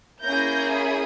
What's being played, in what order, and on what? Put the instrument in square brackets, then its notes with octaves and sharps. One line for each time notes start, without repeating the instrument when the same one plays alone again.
[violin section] A#3 C#4 E4 G#4 G6 A#6
B5 D#6